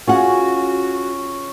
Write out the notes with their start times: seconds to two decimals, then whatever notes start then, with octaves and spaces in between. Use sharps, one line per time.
0.07 C#4 F4 F#4 G#4 F#5